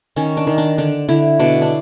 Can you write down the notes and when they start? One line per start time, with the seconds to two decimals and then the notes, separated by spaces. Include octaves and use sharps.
0.16 D#3 C#4
0.37 D4
0.47 D#3
0.58 D4
0.78 D3 D4
1.09 D3 E4
1.39 B2 D4
1.62 D4